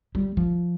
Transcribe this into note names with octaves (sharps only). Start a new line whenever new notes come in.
G3
F3